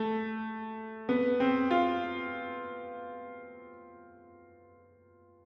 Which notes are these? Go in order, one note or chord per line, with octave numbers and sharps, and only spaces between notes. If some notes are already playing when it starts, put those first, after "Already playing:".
Already playing: A3
B3
C4
F4